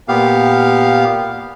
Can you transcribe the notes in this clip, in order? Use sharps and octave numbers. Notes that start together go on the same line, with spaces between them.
A#2 B3 G4 F5